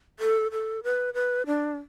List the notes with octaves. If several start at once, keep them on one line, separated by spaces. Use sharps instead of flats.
A4
A4
B4
B4
D4